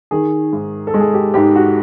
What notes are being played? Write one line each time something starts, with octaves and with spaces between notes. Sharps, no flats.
D#3 G#4
G#2
A4
G#3
G#4
G4
G#2 G4
F#4